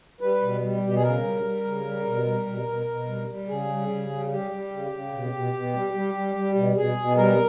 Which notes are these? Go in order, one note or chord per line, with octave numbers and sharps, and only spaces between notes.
G3 B4
B2
G3
B2 G4
G#4
C#3 A#4
G3
G3
C#3
G3
B2
G3
B2
B2
B2
G3
G3
C#3 G#4
G3
C#3
G3
G3 G4
G3
C#3
C#3
B2
B2
B2
G3
G3
G3
G3
B2
B2 G#4
B2
G3 A#4